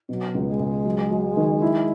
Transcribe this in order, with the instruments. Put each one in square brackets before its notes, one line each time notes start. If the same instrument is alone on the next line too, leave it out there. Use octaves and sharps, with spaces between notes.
[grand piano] B2 [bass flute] F#3
[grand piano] C#2
[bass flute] G#3
[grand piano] C#2
F#3
F#3
D#3
E4